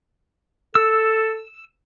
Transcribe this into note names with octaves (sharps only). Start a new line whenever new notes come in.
A4 E6